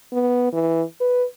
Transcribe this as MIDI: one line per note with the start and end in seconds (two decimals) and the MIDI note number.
0.13 0.51 59
0.53 0.83 52
1.01 1.24 71